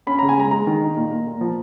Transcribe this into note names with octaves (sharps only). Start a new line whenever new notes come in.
C#4 B5
C#3 A#5
G#5
G#3 A#5
G#3 A#5
D#3
D#4
A#2
A#2
A#2
F3